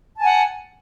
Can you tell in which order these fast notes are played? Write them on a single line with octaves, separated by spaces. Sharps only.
A5 G#5 F#5